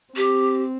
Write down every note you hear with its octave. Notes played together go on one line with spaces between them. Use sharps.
C4 G4